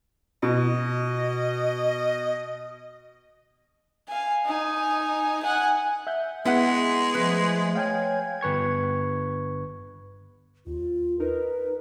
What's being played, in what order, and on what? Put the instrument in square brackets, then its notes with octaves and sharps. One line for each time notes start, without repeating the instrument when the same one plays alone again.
[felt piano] B2 [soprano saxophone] D#5
[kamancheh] F5 G#5
D#4 G#5
F#5 G#5
[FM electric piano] E5 F#5 G6
[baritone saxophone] G#3 [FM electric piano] B3 [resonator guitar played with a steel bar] E4 G#4 F#5
[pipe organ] F3 A3 [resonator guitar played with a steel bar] B4
[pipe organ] C#5 G#6 [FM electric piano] F5 G5 G#5
[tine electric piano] G1 B4 C#6 G#6
[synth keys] D#2 [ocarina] F4
[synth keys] D#4 A#4 [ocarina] B4